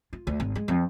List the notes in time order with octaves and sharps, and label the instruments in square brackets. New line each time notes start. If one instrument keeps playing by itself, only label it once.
[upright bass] F4
D2
G#1
G#3
F2